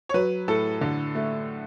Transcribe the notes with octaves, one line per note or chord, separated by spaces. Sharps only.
C#5
F#3 B4
A2 A4
D3
A3